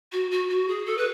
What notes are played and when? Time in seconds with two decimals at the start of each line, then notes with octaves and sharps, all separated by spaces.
0.12 F#4
0.31 F#4
0.49 F#4
0.68 G#4
0.86 A4
0.97 B4